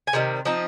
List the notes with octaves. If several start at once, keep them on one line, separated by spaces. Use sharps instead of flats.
G#5
C3 D#3 G3
F3 C4 D#4